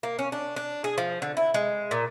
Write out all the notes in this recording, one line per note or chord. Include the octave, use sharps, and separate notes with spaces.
A#3
C#4
D4
D4
G#4
F3
D3
E4
G#3
A#2